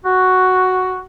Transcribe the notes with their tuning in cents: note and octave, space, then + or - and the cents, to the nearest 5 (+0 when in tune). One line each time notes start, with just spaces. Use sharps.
F#4 +5